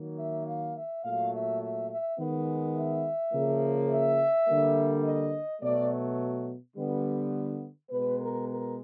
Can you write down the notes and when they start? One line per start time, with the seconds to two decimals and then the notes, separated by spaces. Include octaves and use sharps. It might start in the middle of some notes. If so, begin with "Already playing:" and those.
Already playing: D#3 F#3 A#3
0.17 E5
0.46 F5
0.75 E5
1.03 A#2 F#3 A3 F5
1.33 E5
1.60 E5
1.89 E5
2.18 D#3 G#3 B3
2.76 E5
3.33 C#3 F3 A#3
3.90 E5
4.47 D3 G3 A#3
5.04 D#5
5.62 B2 F#3 A3 D5
6.76 D3 G3 B3
7.90 B2 G#3 B3 B4
8.20 A#4
8.48 A#4